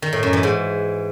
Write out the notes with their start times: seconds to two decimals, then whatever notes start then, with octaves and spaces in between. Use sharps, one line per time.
0.02 D#3
0.13 A2
0.23 F#2
0.33 E3
0.43 G#2